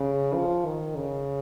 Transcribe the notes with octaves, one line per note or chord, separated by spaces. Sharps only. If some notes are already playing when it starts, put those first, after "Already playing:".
Already playing: C#3
F3
D#3
C#3